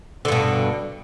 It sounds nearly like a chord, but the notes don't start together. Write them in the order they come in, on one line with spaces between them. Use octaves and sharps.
D3 G2 B2